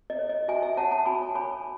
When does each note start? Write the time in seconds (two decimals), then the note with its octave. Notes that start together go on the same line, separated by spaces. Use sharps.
0.10 D#5
0.19 C#5
0.29 D#5
0.48 F#4 E5 G#5
0.63 E5 G#5
0.77 C#5 F#5 A5
0.91 F#5 A5
1.05 F#4 G#5 B5
1.35 C#5 G#5 B5